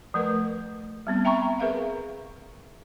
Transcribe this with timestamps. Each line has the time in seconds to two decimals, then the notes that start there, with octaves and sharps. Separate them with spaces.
0.14 F3 A3 A#4 B4
1.07 G3 B3 C4
1.25 E5 G5 A#5 B5 C#6
1.60 G#4 A#4 B4 E5 F5